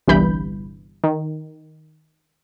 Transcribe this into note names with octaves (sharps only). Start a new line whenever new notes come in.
G1 C2 G2 E3 B5 G6
D#3